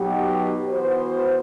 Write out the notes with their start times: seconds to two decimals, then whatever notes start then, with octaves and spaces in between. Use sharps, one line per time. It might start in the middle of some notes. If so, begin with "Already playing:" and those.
Already playing: B2 F#3 B3 D#4 G4
0.69 E3 B3 F#4 C5